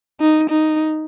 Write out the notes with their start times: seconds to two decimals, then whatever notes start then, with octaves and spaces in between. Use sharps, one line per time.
0.21 D#4
0.50 D#4